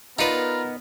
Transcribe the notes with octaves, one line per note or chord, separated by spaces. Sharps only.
B3 D#4 F4 A#4 B4 D5